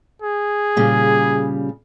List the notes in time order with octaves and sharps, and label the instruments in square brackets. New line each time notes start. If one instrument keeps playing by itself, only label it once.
[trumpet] G#4
[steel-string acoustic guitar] A#2 C#3 G3